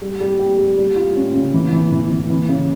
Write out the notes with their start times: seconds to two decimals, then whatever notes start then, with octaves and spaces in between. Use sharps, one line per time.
0.02 G3
0.20 G3
0.39 G4
0.58 G3
0.78 G3
0.96 F4
1.16 C#4
1.35 C#3
1.54 E3
1.72 E3
1.92 E3
2.11 E3
2.30 E3
2.49 C#3